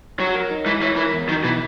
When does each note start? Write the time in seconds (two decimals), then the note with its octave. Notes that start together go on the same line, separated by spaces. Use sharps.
0.19 F#3 C#5
0.34 A#4
0.50 D#4
0.66 E3 G#3
0.81 E3 C#5
0.96 E3 A#4
1.13 E2
1.29 D#3 F#3
1.44 B2 E3